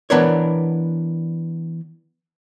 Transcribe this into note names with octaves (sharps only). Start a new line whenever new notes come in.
E3 B3 D4 A#4 C#5